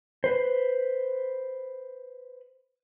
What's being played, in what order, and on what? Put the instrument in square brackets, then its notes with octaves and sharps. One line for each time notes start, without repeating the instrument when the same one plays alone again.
[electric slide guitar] B4 C5